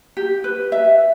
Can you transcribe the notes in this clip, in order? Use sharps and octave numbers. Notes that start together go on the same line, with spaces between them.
G4
B4
E5